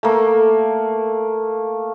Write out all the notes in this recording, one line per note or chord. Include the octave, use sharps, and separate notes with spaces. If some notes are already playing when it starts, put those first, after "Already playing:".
A3 A#3